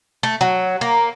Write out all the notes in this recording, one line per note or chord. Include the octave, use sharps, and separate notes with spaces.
A3
F#3
A#3